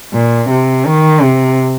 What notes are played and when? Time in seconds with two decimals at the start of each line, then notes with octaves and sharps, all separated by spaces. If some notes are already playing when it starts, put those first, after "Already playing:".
0.13 A#2
0.50 C3
0.86 D#3
1.22 C3